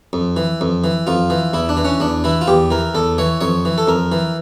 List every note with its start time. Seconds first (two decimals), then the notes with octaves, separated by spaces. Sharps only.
0.13 F2
0.37 E3
0.61 F2
0.84 E3
1.07 F2 F4
1.30 E3
1.53 E2 E4
1.69 D4
1.77 E3
1.85 C#4
2.00 E2 D4
2.24 E3 E4
2.41 F4
2.47 E2 G4
2.71 E3 A#4
2.95 E2 A4
3.18 E3 C#5
3.41 F2 C#5
3.65 E3
3.78 A4
3.87 F2 A#4
4.12 E3